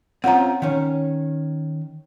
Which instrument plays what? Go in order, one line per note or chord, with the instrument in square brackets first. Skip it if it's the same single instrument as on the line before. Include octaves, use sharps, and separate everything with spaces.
[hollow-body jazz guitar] C4 C#4 F4 [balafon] F#5 A#5
[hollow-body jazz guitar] D#3 C#4